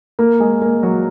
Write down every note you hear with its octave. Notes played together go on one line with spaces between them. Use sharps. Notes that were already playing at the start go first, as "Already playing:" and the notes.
A#3 A#4
G#3 G#4
A#3 A#4
F#3 F#4